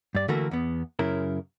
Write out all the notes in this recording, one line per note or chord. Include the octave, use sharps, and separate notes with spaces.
G2 D5
D3 E3 A3 A#3 F#4 A#4
E2 B3
F#2 C#3 E4 A#4